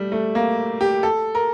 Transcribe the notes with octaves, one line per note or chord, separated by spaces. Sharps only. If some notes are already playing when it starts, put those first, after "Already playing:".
Already playing: G3 A3
A3
A#3
G4
A4
A#4